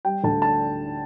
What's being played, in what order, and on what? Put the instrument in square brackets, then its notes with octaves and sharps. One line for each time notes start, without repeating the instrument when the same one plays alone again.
[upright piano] G3 G5
D2 A5
A5